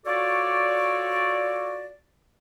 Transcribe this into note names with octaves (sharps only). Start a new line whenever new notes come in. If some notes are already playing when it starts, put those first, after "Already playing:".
F4 F#4 A4 C#5 D5